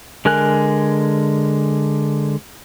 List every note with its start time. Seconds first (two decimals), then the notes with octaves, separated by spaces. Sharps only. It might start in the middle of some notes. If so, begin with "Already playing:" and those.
0.25 D3 G#3 A#4 G#5 F#6